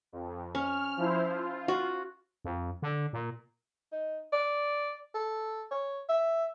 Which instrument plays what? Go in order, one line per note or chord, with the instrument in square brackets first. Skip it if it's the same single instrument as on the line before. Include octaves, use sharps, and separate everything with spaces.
[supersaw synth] F2
[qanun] C#4 [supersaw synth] F6
[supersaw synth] F3 E4 C5
F4
[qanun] F#4
[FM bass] F2
D3
A#2
[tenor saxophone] D#4
D5
A4
C#5
E5